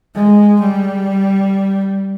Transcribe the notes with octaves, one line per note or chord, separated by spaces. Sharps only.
G#3
G3